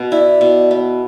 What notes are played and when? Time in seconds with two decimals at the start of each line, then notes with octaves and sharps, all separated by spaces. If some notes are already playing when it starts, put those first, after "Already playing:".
Already playing: B2 B3
0.12 E4 D5
0.41 B2
0.71 B3